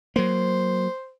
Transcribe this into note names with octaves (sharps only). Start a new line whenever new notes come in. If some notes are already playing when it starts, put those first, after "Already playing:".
F#3 A#3 C5